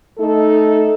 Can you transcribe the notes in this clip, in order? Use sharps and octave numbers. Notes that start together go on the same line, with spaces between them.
A3 D#4 A4